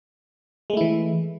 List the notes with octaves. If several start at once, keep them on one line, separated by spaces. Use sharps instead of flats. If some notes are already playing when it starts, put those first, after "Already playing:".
E3 G#3 A3 E4